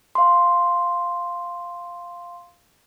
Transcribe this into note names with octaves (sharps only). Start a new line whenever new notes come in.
F5 C6